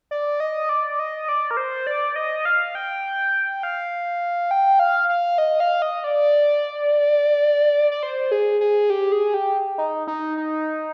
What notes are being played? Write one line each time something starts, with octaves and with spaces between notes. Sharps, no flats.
D5
D#5
D5
D#5
D5
A#4
C5
D5
D#5
F5
G5
F5
G5
F5
F5
D#5
F5
D#5
D5
D5
C5
G#4
G#4
G4
G#4
G4
D#4
D#4
D#4